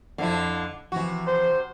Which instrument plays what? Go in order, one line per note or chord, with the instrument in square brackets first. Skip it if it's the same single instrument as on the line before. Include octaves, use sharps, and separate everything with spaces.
[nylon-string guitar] F2 C5 F5 [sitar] D3 F3 E4
[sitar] C3 F#4 [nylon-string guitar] E3 F3
[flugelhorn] C5